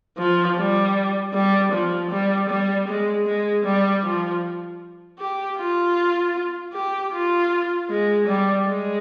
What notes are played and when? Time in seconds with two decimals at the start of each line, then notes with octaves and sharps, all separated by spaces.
0.18 F3
0.57 G3
1.33 G3
1.72 F3
2.11 G3
2.49 G3
2.88 G#3
3.26 G#3
3.65 G3
4.03 F3
5.19 G4
5.58 F4
6.73 G4
7.12 F4
7.90 G#3
8.27 G3
8.66 G#3